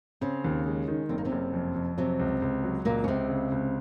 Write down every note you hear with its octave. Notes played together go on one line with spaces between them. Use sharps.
C#3 C4 C#4
D#2
G#3
D#3
F#1 C4
A#3
C3 C4
F#1
F2
F2
C3 F#3 C4
C#2
C#2
F#3
C#2 A#2 A#3
C#4
C#2 C3 C4
C#3
C#2